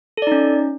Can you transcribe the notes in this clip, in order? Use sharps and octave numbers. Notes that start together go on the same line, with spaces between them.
C#4 D#4 A4 D5